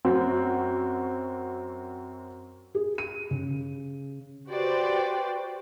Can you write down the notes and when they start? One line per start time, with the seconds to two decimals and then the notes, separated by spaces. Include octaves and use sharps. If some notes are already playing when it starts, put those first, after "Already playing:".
0.05 F#2 C4 F#4
2.75 G#4
2.98 D#7
3.31 C#3
4.48 F#4 G4 B4 C5 D5 G5